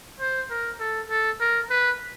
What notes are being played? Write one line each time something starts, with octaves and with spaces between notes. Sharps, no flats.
C5
A#4
A4
A4
A#4
B4